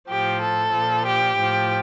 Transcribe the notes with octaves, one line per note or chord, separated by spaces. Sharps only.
A2 F3 G4
A4
A#2 F3
G4
A2 F3